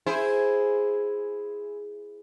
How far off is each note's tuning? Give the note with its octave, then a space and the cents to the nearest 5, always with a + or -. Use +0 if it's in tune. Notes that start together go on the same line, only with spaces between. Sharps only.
E4 +5 G#4 +0 C5 +0